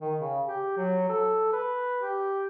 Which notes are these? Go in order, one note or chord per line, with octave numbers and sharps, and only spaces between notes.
D#3
C#3
G4
F#3
A4
B4
G4